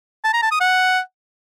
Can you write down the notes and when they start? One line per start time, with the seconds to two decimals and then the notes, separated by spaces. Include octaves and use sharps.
0.24 A5
0.33 A#5
0.42 A5
0.51 D#6
0.60 F#5